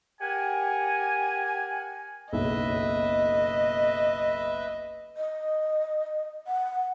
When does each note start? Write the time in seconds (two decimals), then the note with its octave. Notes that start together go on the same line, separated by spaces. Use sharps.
0.20 G4 A#4 F#5 G#5
2.33 F#1 B1 B4 D#5 E5
5.17 D#5
6.47 F#5